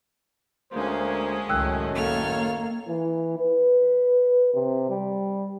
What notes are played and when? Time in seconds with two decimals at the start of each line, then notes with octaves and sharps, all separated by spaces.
0.72 D2 G#3 A#3 C#4 C5
1.49 C#2 F#2 A2 D#3 G5 E6 F#6
1.95 A#3 A4 C#5 F6
2.88 E3
3.38 B4
4.54 C3
4.90 G3